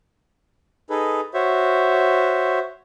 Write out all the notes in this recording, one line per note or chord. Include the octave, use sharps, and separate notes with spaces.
D#4 G#4 A4 B4
F#4 C5 C#5 E5